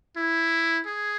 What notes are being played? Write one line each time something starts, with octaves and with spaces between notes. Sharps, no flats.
E4
G#4